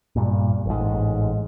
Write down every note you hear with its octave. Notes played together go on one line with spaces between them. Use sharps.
G2 A#2
A1 G#2